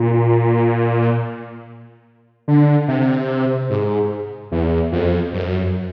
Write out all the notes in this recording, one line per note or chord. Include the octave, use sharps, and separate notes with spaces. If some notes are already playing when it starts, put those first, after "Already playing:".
Already playing: A#2
D3
C3
G#2
E2
F2
F#2